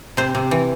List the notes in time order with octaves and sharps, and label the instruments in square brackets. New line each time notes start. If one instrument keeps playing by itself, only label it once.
[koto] C3 C5
C3
E3